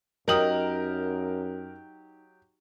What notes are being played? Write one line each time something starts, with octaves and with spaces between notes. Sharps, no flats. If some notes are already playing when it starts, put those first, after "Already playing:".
F#2 F#3 D#4 G4 A#4 D#6 F#7